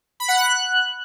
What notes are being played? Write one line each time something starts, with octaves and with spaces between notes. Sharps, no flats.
B5
F#5
F#6